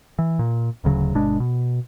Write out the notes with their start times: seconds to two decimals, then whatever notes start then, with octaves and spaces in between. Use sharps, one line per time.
0.19 E3
0.39 A#2
0.84 D1 D2 C#3 F#3
1.15 G1 B2 G#3 D4
1.40 B2